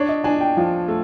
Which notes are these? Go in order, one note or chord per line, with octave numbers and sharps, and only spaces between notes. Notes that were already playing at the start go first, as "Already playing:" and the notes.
Already playing: D4 C#5
D#5
D4 G#5
G5
F3
A3